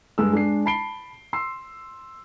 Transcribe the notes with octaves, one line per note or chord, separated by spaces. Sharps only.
G2 G#3 E6
G#3 D4 C7
A5 B5 C7 D7 G7
C6 E6 C7